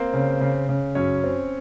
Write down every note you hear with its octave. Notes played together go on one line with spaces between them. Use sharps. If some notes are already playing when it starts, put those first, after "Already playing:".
Already playing: A#3 C4 C5
C#3
C#3
C#3
F#2 C#4 C#5
C4